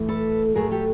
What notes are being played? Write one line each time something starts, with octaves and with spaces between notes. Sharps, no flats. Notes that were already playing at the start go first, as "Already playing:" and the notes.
Already playing: A2 E3 A3
A4 B4
A2 F#3 A3 G#4 A#4
G4 A4